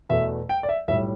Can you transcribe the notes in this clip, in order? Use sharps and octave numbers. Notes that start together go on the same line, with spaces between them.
E2 B2 A3 E5
G5
D5
E5
B1 A2 G3 E5